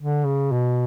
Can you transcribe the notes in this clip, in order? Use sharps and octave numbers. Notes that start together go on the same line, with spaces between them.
D3
C#3
B2